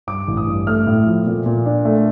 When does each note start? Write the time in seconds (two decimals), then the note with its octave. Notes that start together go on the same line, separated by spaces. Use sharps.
0.07 G2 D6
0.28 A1
0.37 D#6
0.47 G2
0.67 A3 F6
0.87 A2
1.06 F3
1.26 A#2
1.46 A#2
1.66 D4
1.85 A3